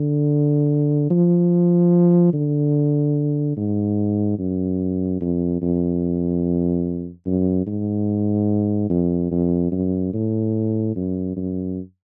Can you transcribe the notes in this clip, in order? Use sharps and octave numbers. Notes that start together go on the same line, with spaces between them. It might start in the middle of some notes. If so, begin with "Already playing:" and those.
Already playing: D3
F3
D3
G#2
F#2
F2
F2
F#2
G#2
F2
F2
F#2
A2
F#2
F#2